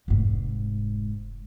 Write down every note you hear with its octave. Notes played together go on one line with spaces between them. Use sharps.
F1 G#2